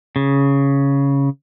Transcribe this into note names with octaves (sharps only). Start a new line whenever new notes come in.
C#3